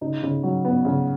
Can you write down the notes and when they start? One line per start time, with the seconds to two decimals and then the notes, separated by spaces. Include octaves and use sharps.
0.01 C#3 D#4
0.23 C#3
0.43 F#3
0.65 B3
0.85 C#3